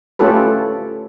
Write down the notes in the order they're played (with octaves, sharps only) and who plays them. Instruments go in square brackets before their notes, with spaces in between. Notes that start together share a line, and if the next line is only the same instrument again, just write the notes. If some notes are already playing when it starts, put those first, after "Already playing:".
[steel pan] A3 C#4 F4 G4 A4 B4